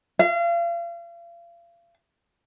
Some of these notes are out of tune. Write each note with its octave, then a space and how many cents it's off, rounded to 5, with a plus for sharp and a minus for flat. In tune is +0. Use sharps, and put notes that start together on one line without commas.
F5 -35